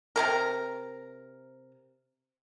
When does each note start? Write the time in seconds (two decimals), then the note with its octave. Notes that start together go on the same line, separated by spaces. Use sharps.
0.16 C3 G#3 A#4